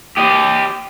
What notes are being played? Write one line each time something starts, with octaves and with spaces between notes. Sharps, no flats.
G4 D#5